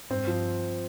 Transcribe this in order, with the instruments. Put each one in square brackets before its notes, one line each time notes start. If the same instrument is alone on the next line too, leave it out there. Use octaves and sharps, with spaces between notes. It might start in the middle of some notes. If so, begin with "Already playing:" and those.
[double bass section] G2 [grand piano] C4
[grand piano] F3